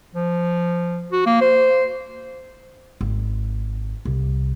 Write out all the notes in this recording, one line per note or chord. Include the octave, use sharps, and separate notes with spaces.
F3
F#4
A#3
C5
G#1
C2